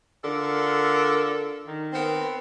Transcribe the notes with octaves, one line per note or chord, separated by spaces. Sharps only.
D3 F4 A4 A#4
D#3
B3 C4 A#4